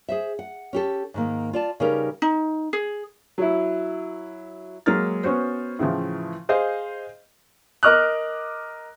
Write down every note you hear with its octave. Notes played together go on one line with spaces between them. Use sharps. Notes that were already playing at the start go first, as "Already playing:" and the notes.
G#4 C5 E5
F#5
C#4 G4 A4
G#2 D#3 A#3
F4 D5 A5
C#3 G3 D#4 G4 A#4 B4
D#4
G#4
F#3 E4
F#3 G#3 A#3 F6 A6
B3 C#4 F#4 C5
A2 C#3 E3 F3
G#4 C5 D#5 F5
A#4 D#5 D6 F6 F#6